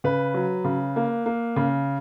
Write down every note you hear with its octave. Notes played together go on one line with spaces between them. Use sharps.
C#3 B4
F#3
C#3
A#3
A#3
C#3